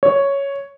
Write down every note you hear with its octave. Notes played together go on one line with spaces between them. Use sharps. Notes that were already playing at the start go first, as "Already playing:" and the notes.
C#5